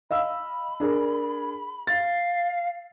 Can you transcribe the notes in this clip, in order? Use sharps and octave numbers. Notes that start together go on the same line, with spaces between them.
D#5 F5 B5 E6
D4 G#4 A#4
F5 A6